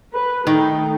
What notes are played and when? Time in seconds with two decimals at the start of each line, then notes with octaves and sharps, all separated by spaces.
0.11 B4
0.47 D#3 A3 D#4